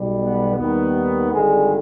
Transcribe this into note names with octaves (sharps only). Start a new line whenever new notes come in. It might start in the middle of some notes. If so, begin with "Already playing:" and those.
Already playing: B1 B2 G3
B3
D#2 D#3 G3 B3
G#1 G2 D3 G#3